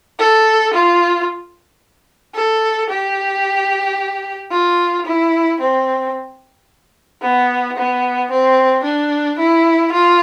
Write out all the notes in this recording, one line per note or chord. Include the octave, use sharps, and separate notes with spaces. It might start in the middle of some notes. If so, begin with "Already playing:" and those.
A4
F4
A4
G4
F4
E4
C4
B3
B3
C4
D4
E4
F4